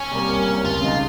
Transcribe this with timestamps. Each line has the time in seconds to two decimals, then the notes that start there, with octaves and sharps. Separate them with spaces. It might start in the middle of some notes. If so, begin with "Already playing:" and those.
Already playing: C#4
0.11 C3 G3 A#3
0.29 C2
0.47 C3 G3 A#3
0.64 C#2 F4
0.82 C#3 G#3 D#4